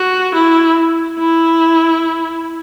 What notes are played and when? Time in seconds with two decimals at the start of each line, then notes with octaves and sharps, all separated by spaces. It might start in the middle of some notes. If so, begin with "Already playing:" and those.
Already playing: F#4
0.35 E4
1.19 E4